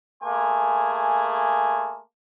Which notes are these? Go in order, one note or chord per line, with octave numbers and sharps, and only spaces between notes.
A3 A#3 G#4 G#5 C6